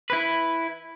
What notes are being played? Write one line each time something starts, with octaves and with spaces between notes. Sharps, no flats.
E4 B4